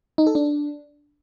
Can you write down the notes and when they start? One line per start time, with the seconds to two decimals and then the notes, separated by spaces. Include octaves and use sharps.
0.18 D#4
0.27 A4
0.35 D4